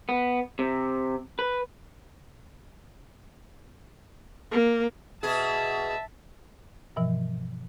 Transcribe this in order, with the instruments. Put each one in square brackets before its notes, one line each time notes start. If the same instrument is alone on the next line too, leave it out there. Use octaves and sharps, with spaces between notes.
[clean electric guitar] B3
C3
B4
[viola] A#3
[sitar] B2 G#4 [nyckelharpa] E5 A5
[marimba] G2 B2 E3 F3